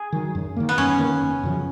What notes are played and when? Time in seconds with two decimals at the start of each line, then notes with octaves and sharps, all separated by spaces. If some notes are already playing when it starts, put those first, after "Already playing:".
Already playing: G#4
0.12 D#3 F#3
0.35 F#2
0.56 D#3 A#3
0.69 B3
0.78 F#2 C#4
0.99 D#3 A#3
1.21 F#1
1.43 F#2 C#3 F3